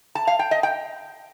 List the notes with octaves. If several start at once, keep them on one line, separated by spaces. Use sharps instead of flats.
A5
F5
G5
D#5
G5